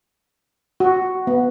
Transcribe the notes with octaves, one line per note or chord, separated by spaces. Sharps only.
F#4
B3